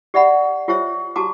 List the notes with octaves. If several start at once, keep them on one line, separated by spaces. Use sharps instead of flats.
G4 D5 E5 F#5 B5
F4 G4 C5 C#5 E5
F#4 G4 A5 A#5 D6